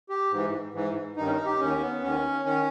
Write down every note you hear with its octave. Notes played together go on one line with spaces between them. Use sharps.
G4
G#2 E3
G#2 E3
G2 D#3 D#4
C#4
D#4
G4
D#2 D#3 C#4
B3
D#2 D#3 C#4
D#3 C#4